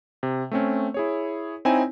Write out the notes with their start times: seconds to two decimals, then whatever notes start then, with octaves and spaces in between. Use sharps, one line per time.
0.23 C3
0.51 A3 C4 C#4
0.94 E4 G#4 C#5
1.65 C4 D#4 E4 C#5 G#5